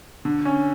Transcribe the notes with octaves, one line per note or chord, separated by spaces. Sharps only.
D3
C#4